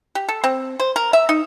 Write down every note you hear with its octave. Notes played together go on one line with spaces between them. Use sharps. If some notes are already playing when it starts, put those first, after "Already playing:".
G4
A4
C4
C5
A#4
E5
D#4